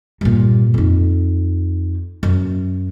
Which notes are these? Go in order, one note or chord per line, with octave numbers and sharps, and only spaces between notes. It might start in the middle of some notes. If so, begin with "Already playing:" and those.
G2 A#2
F2 D#4
F#2